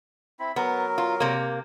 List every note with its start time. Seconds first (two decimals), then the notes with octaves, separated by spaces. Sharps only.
0.40 C4 E4 B5
0.56 F#3 B3 A#4
0.98 F4
1.20 C3 A#3